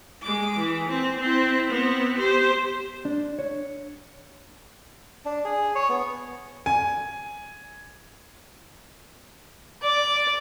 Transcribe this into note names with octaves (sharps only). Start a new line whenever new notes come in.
G#3 D6
E3
C4
C4 E4
B3 C4
G4 C5
D4
C#5
D4
G#4
C#5
B3
G#5
D5